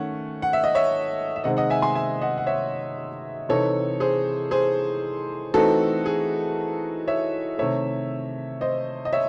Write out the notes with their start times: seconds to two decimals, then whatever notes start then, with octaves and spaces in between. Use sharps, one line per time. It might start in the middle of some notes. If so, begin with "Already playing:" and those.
Already playing: D#3 A3 C#4 F#5
0.42 F#5
0.53 E5
0.64 D#5
0.75 C#5 E5
1.36 E5
1.44 C3 D#3 G#3 C4 D#5 F#5
1.57 D#5 F#5
1.70 E5 G#5
1.82 G#5 C6
1.95 E5 G#5
2.21 D#5 F#5
2.38 F#5
2.47 C#5 E5
3.49 C3 E3 C4 D#4 A4 C#5
4.00 G#4 C5
4.51 G#4 C5
5.54 E3 A3 C4 D#4 F#4 A4
6.06 G#4
7.07 C#5 E5
7.58 C3 D#3 A3 C#5 E5
8.61 C5 D#5
9.05 D#5
9.13 C#5 E5